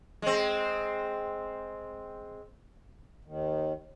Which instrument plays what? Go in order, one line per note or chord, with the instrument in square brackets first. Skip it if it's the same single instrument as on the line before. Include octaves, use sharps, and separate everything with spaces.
[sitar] G#3 C4
[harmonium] D#2 D#3